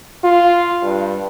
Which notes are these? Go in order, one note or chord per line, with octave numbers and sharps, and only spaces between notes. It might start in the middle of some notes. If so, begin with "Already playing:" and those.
F4
G2